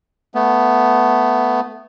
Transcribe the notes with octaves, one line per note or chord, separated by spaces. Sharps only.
A3 B3